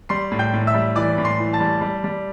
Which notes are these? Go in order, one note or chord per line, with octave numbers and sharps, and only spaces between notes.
G3 C6 C7
A2
G5 G6
A2
E5 E6
G3
E3 D5 D6
A2
C6 C7
E3
A5 A6
G3
G3
G3